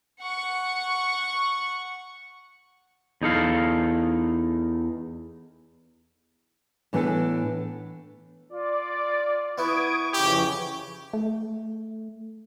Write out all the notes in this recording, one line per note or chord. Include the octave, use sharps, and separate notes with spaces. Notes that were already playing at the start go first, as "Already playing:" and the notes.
F#5 C#6
E2 D#4 A4 F5
A2 E3 B3 D4 A4 G#5
F4 D5
B3 E4 C#6 D#6 G#6 D7
F2 C#3 E3 G4
A3